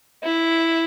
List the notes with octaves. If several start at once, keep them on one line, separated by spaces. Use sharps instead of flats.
E4